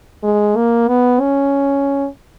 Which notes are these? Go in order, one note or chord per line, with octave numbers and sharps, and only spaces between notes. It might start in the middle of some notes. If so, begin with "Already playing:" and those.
G#3
A#3
B3
C#4